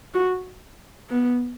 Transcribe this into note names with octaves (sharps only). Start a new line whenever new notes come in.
F#4
B3